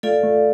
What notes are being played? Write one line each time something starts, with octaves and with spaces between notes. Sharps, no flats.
A3 F4 A4 D5 F5
A3